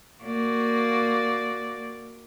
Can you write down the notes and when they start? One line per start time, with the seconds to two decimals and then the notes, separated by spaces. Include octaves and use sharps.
0.23 A#3 F#4 D5